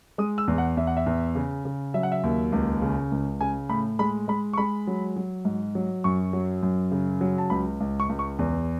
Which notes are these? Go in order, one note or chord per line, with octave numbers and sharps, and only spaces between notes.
G#3 D#6
E6
E2
F#5
E2 E5
F#5
E5
E2
C#3
C#3
F#3 E5
F#5
E5
D#2
C#2
C#3
C#2
C#3 G#5
A2 B5
G#3 B5
G#3 B5
C#6
G#3 B5
F#3
F#3
G#2
F#3
F#2 C#6
F#3
F#2
C#3
F#3
A5
C#2 B5
C#2
C#6
C#2
C#6
E2